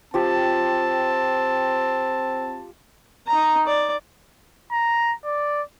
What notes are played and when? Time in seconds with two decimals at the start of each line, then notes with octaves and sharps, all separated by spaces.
0.14 F3 C4 G4 A5
3.27 D#4 A#5
3.66 D5
4.72 A#5
5.25 D5